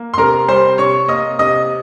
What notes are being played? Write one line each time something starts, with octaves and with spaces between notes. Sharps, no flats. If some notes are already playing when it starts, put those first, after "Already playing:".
Already playing: A#3
C6
C3 A#4 A#5
G3 C5 C6
C3 C#5 C#6
A#3 D#5 D#6
C3 D#5 D#6